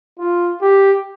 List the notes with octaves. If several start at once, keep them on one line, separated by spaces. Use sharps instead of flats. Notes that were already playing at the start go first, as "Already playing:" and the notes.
F4
G4